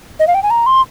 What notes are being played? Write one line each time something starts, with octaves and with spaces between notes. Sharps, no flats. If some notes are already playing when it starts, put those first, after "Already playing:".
D#5
F5
G5
G#5
A#5
C6